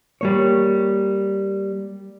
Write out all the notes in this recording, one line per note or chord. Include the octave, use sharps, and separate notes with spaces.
G3 A#3 C#5